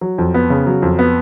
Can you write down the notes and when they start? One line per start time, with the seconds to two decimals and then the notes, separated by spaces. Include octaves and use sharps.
0.01 F#3
0.18 F2
0.34 B3
0.50 C#3
0.66 F#3
0.82 F2
0.99 B3